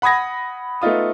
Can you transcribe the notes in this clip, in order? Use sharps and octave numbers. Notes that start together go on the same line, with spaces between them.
F#5 B5 D#6 G#6 A#6
A3 B3 D#4 F4 D#6